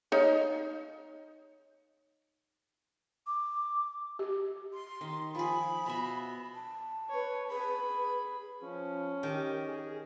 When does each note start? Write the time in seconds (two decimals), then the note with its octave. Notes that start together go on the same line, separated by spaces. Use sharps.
0.12 D#4 C#5 F5
3.27 D6
4.19 G4
4.74 C6
5.01 D#3
5.35 F3 G#4 B5
5.86 B2 E5
6.54 A5
7.09 B4 C#5
7.48 G#4 B4 B5
8.62 F3 C#4
9.23 D#3 G4
9.68 G#4